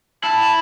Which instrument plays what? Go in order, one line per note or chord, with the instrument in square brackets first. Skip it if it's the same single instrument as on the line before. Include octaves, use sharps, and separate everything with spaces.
[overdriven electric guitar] E4 [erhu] A5